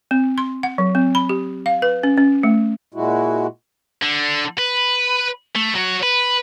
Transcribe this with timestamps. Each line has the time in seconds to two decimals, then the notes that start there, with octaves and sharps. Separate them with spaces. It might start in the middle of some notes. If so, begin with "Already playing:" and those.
0.11 C4
0.38 C6
0.63 F#5
0.78 F#3
0.95 C4
1.15 B5
1.29 G4
1.66 F5
1.82 B4
2.03 C#4
2.17 C#4
2.43 A3
2.94 A#2 G#3 E4 F#4
4.02 D3
4.58 B4
5.55 A3
5.75 F#3 F#4
6.03 B4